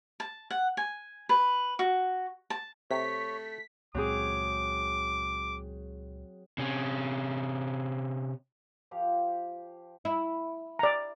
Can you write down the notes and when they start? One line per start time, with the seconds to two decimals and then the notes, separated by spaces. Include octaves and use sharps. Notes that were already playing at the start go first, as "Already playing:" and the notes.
0.20 A5
0.51 F#5
0.77 G#5
1.29 B4
1.79 F#4
2.50 A5
2.91 C3 A3 C#5 B6
3.95 C#2 A#2 F#3 G#3 C4 G#4 D6
6.58 C3 C#4
8.91 F3 G4 F5
10.05 E4
10.79 D5 A#5